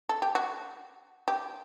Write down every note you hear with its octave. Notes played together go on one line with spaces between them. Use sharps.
A4
G4
F#4
G4